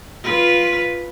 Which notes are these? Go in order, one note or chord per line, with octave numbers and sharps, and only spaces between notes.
F4 B4